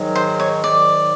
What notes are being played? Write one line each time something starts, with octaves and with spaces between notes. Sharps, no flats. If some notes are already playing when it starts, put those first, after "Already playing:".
Already playing: G#2 D#3 F#3
C5
C#5
G#2 D#3 F#3 D5